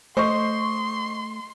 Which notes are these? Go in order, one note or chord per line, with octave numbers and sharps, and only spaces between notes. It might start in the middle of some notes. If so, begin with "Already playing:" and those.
A3 C5 D#5 C6 C#6